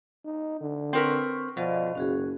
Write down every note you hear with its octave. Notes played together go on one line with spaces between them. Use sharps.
D#4
D3
C4 A#4 B4 C#6
B2 F3 D5 D#5 F5
F#1 C#4 F#4 G#4